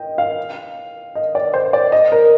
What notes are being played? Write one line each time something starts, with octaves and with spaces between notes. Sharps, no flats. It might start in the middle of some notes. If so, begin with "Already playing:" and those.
Already playing: D#5 G5
F5
D#5
D5
C5
D5
D#5
A#4